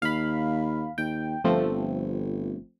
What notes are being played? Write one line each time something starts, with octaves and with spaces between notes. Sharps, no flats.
D#2 F5 B5
D#2 G5
G1 F3 A3 C4